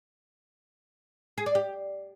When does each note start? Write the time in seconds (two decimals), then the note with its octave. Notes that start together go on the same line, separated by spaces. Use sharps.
1.38 G#4
1.46 D5
1.55 G4